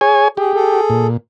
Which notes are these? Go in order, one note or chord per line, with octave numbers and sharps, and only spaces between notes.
G#4 C#5 G#5
G4 G#4
G#4 A4
A#2